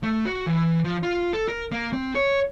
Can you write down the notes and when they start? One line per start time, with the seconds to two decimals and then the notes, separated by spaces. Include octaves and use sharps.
0.03 A3
0.25 F#4
0.46 E3
0.84 F3
1.03 F4
1.33 A4
1.48 A#4
1.72 A#3
1.93 C4
2.15 C#5